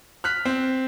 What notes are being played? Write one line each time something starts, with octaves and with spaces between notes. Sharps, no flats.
F6 F#6 B6
C4